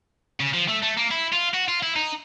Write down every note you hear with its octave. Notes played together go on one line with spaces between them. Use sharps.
C#3
F3
A3
A3
A#3
E4
F4
F#4
F4
E4
D#4